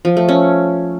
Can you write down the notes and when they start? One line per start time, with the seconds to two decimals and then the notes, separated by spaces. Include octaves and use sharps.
0.05 F3
0.17 A3
0.29 C#4